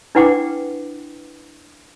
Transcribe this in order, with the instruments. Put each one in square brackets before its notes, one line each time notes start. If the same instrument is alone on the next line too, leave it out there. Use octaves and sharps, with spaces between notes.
[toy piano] D4 E4 B4 F#5 G5 D6